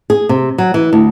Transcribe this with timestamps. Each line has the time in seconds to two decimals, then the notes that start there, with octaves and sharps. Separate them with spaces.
0.10 G#4
0.29 C3
0.58 F#3
0.74 E3
0.93 D2